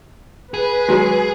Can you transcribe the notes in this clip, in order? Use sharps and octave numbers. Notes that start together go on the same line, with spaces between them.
G#4 B4
F#3 G#3